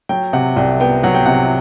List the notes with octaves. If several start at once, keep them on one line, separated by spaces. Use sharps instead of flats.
F#3 G5
C3 F#5
C2 G5
B3 G5
F#3 F#5
G5
C3 F#5